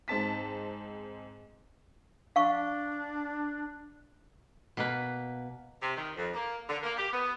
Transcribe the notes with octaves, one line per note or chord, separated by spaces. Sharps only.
G#2 C4 A5 B6
D4 F5 C#6
B2 A#3 B4
C3
D#3
F2
A#3
D3
A#3
G4
B3